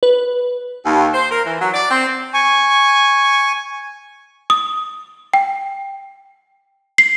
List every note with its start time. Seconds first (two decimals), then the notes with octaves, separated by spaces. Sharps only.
0.03 B4
0.84 D#2
1.14 C5
1.30 A#4
1.45 E3
1.59 F#3
1.73 D5
1.90 C4
2.34 G#5 C#6
4.50 D#6
5.34 G5
6.98 C7